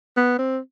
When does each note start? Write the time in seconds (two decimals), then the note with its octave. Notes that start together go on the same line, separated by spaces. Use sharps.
0.17 B3
0.38 C4